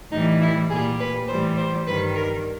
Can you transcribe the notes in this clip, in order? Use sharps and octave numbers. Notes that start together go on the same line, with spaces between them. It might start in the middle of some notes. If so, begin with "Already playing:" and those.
A2 E3 G3 D#4
E4
A#2 G3 G#4
B4
A2 E3 G3 C5
C5
G2 D#3 G3 B4
A#4